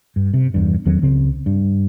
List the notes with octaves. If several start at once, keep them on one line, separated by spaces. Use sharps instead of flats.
G2
C3
E2 G2
E2 D#3 F#3 C4
C#2 C#3 C4
G2